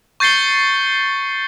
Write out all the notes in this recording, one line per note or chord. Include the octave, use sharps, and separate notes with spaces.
C#6 G6 A6 C7 C#7 G7